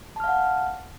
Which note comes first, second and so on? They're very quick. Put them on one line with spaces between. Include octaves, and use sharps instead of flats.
A5 F6 F5 F#5